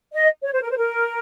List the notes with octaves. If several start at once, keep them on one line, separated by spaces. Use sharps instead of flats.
D#5
C#5
C5
A#4
C5
A#4